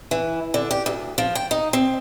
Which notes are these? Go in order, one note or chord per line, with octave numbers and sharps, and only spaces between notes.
E3
D3
G4
D2
F3
G5
D#4
C4